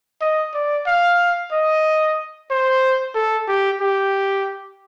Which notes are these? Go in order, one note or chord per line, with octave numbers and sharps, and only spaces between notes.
D#5
D5
F5
D#5
C5
A4
G4
G4